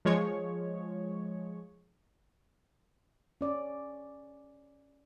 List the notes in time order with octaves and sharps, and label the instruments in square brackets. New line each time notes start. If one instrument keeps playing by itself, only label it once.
[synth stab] F3 G#3 C#5
[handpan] C#4 D5